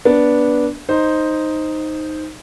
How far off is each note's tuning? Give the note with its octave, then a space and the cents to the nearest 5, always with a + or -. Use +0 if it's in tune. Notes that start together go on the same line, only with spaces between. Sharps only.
B3 -15 D4 -10
D#4 +0 C5 +0